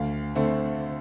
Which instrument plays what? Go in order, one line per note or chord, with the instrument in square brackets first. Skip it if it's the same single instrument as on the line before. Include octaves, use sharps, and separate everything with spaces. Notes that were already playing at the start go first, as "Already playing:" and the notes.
Already playing: [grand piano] D2 F5
D3 A3 C4